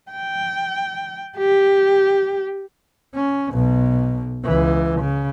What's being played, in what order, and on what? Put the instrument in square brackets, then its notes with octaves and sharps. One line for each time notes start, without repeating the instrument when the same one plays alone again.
[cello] G5
G4
[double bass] C#4
B1 B2
C#2 E3
C#3